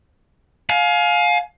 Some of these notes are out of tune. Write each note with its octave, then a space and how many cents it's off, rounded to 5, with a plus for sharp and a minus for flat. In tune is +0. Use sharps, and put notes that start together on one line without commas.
F5 +20 G#5 +30